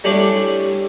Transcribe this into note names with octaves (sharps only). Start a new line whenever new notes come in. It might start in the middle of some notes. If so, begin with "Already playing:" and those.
G3 A3 C#4 D4 E4